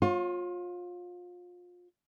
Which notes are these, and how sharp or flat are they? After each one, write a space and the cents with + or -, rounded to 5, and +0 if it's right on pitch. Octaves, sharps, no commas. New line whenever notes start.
F4 +25 C#5 -35